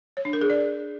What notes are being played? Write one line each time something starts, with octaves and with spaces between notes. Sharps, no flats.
C#5
D4
A#4
G#4
D5